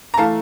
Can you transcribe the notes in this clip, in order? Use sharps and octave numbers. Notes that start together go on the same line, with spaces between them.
A#5
E3 A3 F5 A5